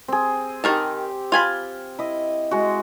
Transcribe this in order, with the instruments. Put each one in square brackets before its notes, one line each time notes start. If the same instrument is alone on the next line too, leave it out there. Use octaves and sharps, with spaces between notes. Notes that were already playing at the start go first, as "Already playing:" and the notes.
[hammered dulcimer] C4 G#4
[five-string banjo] D#3 A#4 A5 [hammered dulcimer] G4
[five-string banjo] F4 G#5 B5
[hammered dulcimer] E4 D#5
G#3 F#4